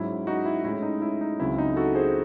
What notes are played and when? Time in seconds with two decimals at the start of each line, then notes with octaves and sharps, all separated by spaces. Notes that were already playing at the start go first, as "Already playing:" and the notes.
Already playing: G#2 F#3 C#4 E4
0.27 D#4 F#4
0.45 E4
0.64 A2 G#3 C#4 E4
0.83 D#4
1.02 E4
1.21 D#4
1.39 C#2 C#3 F#3 C4 E4
1.58 D#4
1.76 F#4 A4
1.95 G#4 C5